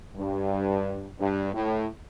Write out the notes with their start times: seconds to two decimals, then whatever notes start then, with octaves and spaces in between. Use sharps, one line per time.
0.16 G2
1.19 G2
1.54 A2